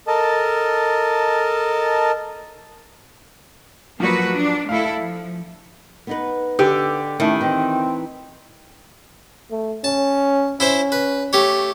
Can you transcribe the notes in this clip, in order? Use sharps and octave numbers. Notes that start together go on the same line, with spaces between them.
A4 A#4 D#5 A5
F3 F#3 A#3 F#4 B4
D4
A3 E4 A4 F5
F3
B3 D#4 B4
D3 G4
D#3 A3 C#4 E4
E3 C4 D#4
A3
C#4 A5
C#4 E4 C5 E5
B4
A3 G4 C#5